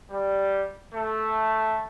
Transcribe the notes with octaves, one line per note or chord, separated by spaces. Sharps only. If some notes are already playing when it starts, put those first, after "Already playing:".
G3
A3